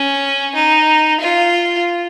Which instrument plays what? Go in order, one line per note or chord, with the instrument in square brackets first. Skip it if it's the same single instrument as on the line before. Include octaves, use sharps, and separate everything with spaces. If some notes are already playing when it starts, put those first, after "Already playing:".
Already playing: [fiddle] C#4
D#4
F4